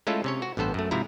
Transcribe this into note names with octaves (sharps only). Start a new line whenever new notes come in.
G#3 A3 C#4 E4 F4 A4
C3 C#4 C#5
F#4
A1 G2 B3 A4 C5
F#2 A3
G#2 C3 F3 E4 A#5